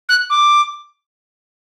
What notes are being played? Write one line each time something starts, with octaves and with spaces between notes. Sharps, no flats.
F#6
D6